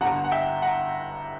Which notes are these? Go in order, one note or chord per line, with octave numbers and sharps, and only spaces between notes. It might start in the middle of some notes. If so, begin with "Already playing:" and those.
G1 G2 D3 F#5 A#5
F#5
E5 G5
F#5 A#5